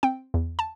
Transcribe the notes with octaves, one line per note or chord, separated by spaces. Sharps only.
C4 G5
E2
A5